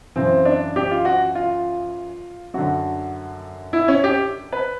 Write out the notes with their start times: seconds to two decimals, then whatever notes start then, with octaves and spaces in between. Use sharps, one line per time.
0.16 F#2 C#3 E3 C4
0.45 D4
0.76 G4
0.91 F4
1.05 F#4
1.35 F4
2.54 F#2 D3 F#4
3.73 E4
3.88 C#4
4.04 G4
4.52 B4